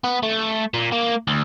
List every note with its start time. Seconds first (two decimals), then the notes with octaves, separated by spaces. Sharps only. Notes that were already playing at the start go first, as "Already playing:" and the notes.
0.04 B3
0.23 A3
0.74 A#2
0.92 A#3
1.27 D2